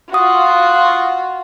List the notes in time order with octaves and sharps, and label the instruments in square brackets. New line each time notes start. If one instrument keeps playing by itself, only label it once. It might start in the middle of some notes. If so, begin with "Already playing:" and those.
[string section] F4 F#4 [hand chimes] F#5 D#6